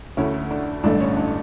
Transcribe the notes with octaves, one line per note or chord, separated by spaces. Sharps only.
D2 D3 A3 C#4 E4
D4
A1 G2 D3 A3 D4
C#4
D4